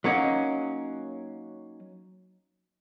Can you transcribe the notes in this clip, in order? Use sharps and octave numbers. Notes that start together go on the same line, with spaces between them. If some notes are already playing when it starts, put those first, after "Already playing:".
F#3 A#3 C#4 D#4